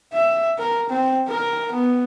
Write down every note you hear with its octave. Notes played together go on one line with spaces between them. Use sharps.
E5
A#4
C4
A#4
B3